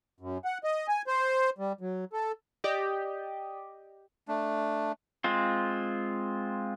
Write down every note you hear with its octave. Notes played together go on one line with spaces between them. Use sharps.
F#2
F#5
D#5
G#5
C5
G3
F#3
A4
G4 D5 D#5
A3 D4
G#3 C4 F4